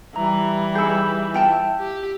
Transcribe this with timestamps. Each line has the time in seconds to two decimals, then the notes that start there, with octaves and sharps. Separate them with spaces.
0.16 E3 G3 A#5
0.75 D#4 G#4 E6 G6
1.34 F4 G5 A5
1.80 G4